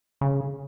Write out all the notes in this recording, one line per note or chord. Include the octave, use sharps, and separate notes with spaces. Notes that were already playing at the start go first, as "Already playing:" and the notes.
C#3